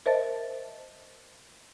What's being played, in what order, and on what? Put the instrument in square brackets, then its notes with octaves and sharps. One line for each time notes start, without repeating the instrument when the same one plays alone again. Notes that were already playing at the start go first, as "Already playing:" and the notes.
[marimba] A#4 C5 D#5 E5 A5 A6